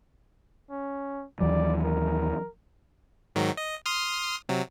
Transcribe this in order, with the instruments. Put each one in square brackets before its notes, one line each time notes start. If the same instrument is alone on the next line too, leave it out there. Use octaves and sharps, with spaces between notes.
[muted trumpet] C#4
[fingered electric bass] D#2 E3 F#3 [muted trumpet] D5
[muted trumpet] A#4
[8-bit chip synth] G#2 D#3 F#3
D#5
C6 D#6 F6
C3 F#3